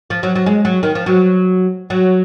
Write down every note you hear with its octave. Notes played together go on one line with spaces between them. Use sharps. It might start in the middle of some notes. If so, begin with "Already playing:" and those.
F3
F#3
F#3
G#3
F#3
D#3
F3
F#3
F#3